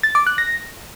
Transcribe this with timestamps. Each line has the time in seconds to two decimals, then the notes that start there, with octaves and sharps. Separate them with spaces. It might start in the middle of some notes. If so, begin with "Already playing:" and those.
0.03 A6
0.15 D6
0.27 F#6
0.38 A#6